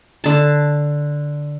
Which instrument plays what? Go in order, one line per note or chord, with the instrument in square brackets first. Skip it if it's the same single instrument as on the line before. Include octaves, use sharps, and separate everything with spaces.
[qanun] D3 A5